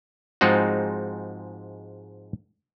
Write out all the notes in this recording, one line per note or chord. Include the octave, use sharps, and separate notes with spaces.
G#2 F3 G#3 C4 D#4 F#4